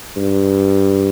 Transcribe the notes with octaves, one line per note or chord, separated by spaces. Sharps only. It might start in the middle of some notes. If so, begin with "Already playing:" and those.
G2